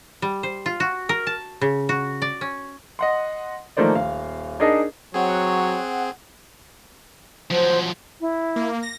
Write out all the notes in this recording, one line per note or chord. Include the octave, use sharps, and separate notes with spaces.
G3
C5
F4
F#4
A#4
A5
C#3
F#4
D5
C#4
D#5 F#5 C6
D#3 F3 A3 A#3 C5 D5
D#1 F5
D4 D#4 G#4 A#4 D#5 A5
F#3 C4 G#4 C#5 F#5
F3 F#3 C5
E4
A#3
A#6